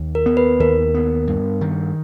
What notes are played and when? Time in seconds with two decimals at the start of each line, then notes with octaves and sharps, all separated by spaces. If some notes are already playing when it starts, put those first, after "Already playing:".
Already playing: D#2
0.15 A#4
0.26 B3
0.37 B4
0.60 D#2 A#4
0.94 B3
1.27 G2
1.61 D#3